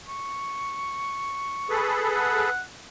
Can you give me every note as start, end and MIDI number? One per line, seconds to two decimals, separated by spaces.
0.08 2.07 85
1.70 2.50 68
1.70 2.50 69
1.70 2.50 71
2.15 2.60 78